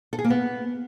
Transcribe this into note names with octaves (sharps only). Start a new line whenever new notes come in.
A4
G#4
A#3
B3